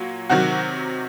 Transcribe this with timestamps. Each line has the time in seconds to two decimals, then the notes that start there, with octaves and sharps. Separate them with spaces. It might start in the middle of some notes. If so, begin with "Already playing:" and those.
Already playing: A#2 F#3
0.29 C3 D#3 F#3 F#4